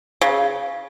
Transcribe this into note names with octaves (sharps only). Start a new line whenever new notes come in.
C#3